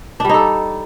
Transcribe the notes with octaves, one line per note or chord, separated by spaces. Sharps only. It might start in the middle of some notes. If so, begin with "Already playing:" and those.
G3 D4 D#4 A4